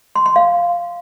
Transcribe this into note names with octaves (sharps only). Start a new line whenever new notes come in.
C6
C6
F5